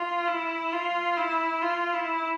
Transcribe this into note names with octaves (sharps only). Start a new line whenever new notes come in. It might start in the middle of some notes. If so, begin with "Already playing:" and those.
Already playing: F4
E4
F4
E4
F4
E4